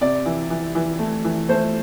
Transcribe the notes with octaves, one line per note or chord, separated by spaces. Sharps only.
C3 D5
E3
E3
E3
A3
E3
A3 C5